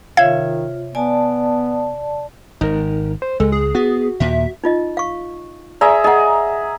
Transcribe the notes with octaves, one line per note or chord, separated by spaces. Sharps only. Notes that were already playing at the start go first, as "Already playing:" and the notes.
C3 D#3 F4 C#5 E5 F5 G#6
B3 D5 G#5 A5
G#1 D#4 A#4
C5
C#2 G#3 A4
G#4
B3 F#4
D#2 A#2 E5
D#4 F4 D#5
F5 C#6
G#4 D5 E5 A#5 C6
G#4 D#5 F#5 A#5